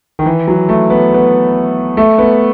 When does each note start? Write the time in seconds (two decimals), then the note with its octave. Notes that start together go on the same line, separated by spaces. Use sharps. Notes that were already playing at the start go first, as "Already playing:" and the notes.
0.19 D#3
0.26 E3
0.48 F#3
0.69 A3
0.90 B3
1.14 B3
1.97 A3
2.18 B3